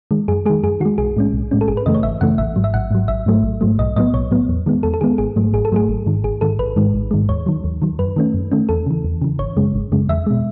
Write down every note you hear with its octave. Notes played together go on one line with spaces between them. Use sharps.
D#3 G#3
F#2 G#4
D#3 G#3 G#4
F#2 G#4
D#3 G#3 F#4
B1 G#4
A2 G#3 C#4
B1
A2 G#3 C#4
A4
G#1 G#4
B4
F#2 C#3 E3 A3 D#5
C#5
G#1 E5
F#2 C#3 E3 A3 F#5
A1 E5
G#2 F#3
E5
A1 F#5
G#2 F#3
A1 E5
G#2 F#3 A3
A1
G#2 F#3 A3
B1 D#5
A2 F#3 B3 D#5
B1 C#5
A2 F#3 B3
E2
D#3 G#3 B3
E2 A4
A4
D#3 G#3 B3 G#4
G#1 G#4
G#2 F#3 A3
G#1 G#4
A4
G#2 F#3 A3 G#4
G#1
G#2 D#3
G#1 G#4
G#2 D#3 A4
A1 B4
G#2 D#3 G#3
A1
G#2 D#3 G#3
D#2 C#5
D#3 F#3
D#2
D#3 F#3
F#2 B4
D#3 A3 C#4
F#2
D#3 A3 C#4
E2 A4
C#3 E3
E2
C#3 E3
G#1 C#5
F#2 C#3 G#3
G#1
F#2 C#3 G#3
E2 E5
B2 G#3